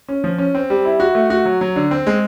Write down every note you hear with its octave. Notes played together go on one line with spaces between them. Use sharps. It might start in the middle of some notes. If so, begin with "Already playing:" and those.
C#4
F3
C#4
C4
G3
E4
F#4
A3
F#4
F#3
F#3
D3
C4
G#3